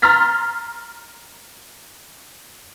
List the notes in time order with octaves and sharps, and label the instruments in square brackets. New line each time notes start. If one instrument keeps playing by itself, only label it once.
[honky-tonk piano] A#5 C6 E6 F6 A6 B6